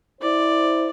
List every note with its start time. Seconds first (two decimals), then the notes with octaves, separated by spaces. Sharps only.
0.22 E4 C5 D5